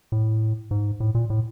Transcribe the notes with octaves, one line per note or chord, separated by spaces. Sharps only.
A2
G#2
A2
A#2
A2